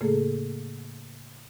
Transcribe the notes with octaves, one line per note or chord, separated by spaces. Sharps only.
A2 C#3 A3 A#3 G#4 A4